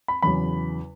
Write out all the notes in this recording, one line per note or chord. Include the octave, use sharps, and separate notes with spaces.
B5
E2 C#3 F#3 B5